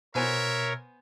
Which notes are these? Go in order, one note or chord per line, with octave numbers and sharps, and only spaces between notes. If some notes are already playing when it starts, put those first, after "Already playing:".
B2 B3 A#4 C5 C#5 E5 G#5